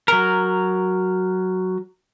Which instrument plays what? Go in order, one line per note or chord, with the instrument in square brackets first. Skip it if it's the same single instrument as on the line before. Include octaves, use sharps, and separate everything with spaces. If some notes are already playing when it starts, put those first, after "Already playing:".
[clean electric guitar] F#3 A#4